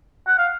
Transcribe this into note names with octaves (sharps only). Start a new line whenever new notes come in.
F#5
F5